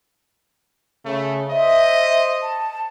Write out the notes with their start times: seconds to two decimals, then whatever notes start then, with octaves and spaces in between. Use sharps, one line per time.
1.06 C#3 A3
1.50 C5 D#5 E5
2.42 A5